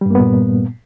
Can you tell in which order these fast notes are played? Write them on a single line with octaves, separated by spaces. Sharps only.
G3 G2 A#3 B3 A#2